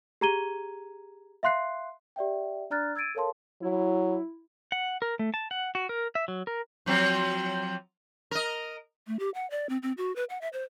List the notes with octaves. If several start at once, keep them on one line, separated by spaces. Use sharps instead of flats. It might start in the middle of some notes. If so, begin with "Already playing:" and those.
G4 G#4 A#5 G#6 D#7 G7
E5 F5 C6 F#6 C7
G4 D5 E5 G5
D4 D5 A#5 F6 F#6 A6
E6 G#6 A6 D7 D#7
A4 A#4 C#5 F5 A5 C6
F#3 E4
F#5
A#4
A3
A5
F#5
F#4
A#4
E5
F#3
A#4
F3 F#3 C4
A#4 D#5
A3
G4
F#5
D5
C4
C4
F#4
B4
F#5
E5
C5